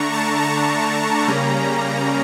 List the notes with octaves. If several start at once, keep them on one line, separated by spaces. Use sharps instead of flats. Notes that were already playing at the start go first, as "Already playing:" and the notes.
Already playing: D3 A3 D4 A#5 C#6
A5
A#5
C#3 G3 A#3 C#4